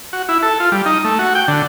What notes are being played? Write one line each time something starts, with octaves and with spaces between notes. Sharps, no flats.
F#4
E4
A4
F4
G3
D#4
A3
F#4
G5
D3